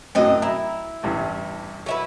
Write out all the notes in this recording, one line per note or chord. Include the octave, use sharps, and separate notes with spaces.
F#2 A2 F#3 C4 D#5
E4 A#5
A1 E2 G2
F#3 E4 B4